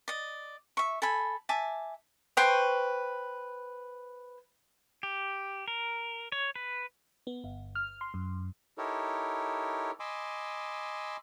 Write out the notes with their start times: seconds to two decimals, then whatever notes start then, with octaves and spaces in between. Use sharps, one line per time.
0.08 D5 D#5
0.77 E5 C#6
1.02 A4 G#5 B5
1.49 E5 G#5 A5 D6
2.37 B4 C5 G5 C#6
5.03 G4
5.68 A#4
6.32 C#5
6.55 B4
7.27 B3
7.44 G1
7.75 F6
8.01 C6
8.14 F#2
8.78 D#4 E4 G4 A4 A#4 C#5
10.00 D#5 G#5 B5 C6 D6 E6